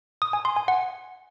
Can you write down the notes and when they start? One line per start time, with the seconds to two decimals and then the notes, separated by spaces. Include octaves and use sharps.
0.22 D#6
0.33 G#5
0.45 C6
0.57 G#5
0.68 F#5